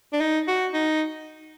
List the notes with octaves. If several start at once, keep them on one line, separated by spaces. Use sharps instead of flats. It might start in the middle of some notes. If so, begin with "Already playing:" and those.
D4
D#4
F#4
D#4